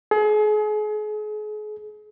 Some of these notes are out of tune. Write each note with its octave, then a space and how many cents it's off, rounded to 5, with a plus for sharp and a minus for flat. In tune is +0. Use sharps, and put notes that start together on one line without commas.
G#4 +35